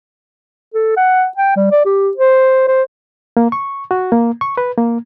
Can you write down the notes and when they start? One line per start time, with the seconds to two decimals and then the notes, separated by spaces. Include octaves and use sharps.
0.74 A4
0.97 F#5
1.37 G5
1.56 G3
1.71 D5
1.86 G4
2.17 C5
2.68 C5
3.37 A#3
3.52 C#6
3.91 F#4
4.12 A#3
4.41 C#6
4.57 B4
4.78 A#3